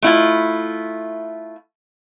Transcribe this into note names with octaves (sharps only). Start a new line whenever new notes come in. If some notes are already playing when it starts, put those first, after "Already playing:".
A3 E4 F4